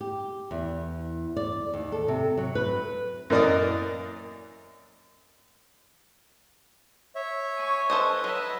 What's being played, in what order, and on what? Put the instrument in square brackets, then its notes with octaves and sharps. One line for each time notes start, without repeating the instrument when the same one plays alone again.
[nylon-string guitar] G4
E2
D5
D#2
A4
C3
F#3
B4
[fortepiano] F#2 E3 A#3 D5 D#5 D#6
[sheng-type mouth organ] C#5 E5
[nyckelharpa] G#5 C#6
[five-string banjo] A4 C5 D#5 [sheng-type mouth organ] B4
[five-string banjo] F#3 [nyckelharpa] D#5 E5